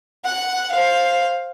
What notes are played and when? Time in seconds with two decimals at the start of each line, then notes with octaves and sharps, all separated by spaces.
0.25 F#5
0.71 C5 F5